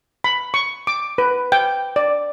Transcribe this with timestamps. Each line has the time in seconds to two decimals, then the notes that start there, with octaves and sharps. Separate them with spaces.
0.24 B5
0.54 C#6
0.87 D6
1.18 B4
1.52 G5
1.96 D5